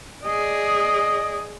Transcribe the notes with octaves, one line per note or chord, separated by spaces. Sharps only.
G#4 D5 D#5